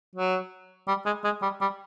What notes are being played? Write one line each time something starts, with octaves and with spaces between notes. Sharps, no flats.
F#3
G3
G#3
G#3
G3
G3